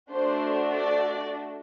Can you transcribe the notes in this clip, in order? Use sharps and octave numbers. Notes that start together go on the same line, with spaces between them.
A3 D4 F#4 A4 C5
D5